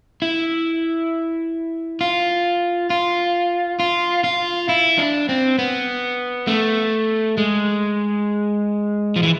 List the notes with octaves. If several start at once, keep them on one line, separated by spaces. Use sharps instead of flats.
E4
F4
F4
F4
F4
E4
D4
C4
B3
A3
G#3
F3
E3